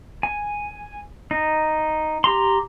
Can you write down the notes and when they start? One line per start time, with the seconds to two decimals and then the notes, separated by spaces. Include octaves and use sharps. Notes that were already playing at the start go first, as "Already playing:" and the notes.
0.23 G#5
1.31 D#4
2.24 G4 A#5 C6